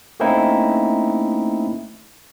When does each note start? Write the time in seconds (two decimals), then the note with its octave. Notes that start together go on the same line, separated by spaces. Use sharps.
0.20 A3 A#3 C4 C#4 D#4 E4